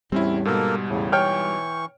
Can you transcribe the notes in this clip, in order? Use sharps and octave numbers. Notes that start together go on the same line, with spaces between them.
E2 A2 G3 C4 C#4 E4
G#2 B2 A#3 A4 A#4
E2 A2 C#3
E3 C#5 G5 C#6 F6